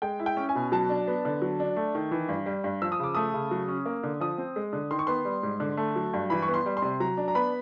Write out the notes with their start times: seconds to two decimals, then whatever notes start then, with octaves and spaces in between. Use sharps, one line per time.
0.02 G#3 G5
0.19 E4
0.26 G5
0.37 C#4
0.49 G#5
0.55 B2
0.72 F#3 A5
0.89 D4
1.07 B3
1.25 D3
1.42 F#3
1.60 D4
1.76 A3
1.95 D#3
2.11 E3
2.29 G2
2.46 G3
2.64 G2
2.82 F3 E6
2.92 D#6
2.99 C#3 D6
3.15 A3 D#6
3.34 C#3
3.51 F#3
3.69 C#4
3.86 A#3
4.04 D3
4.20 F3 D#6
4.38 C4
4.56 G#3
4.73 D3
4.91 D#3 C6
4.99 C#6
5.07 B3 C6
5.25 G3
5.43 G#2
5.60 D3
5.77 A3
5.96 F#3
6.14 G2
6.30 E3 B5
6.42 C#6
6.48 B3
6.54 C6
6.66 G3
6.77 C6
6.82 C3
7.00 F#3 A#5
7.17 D4
7.28 A#5
7.35 B3 B5